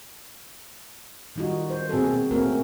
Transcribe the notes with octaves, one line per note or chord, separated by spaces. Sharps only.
D#3 G3 D#4 F4 F#4
C5
B2 C4 F#4 G#4 A4
A#3 A4
A3 A#3 C4 C#4 F#4 A#4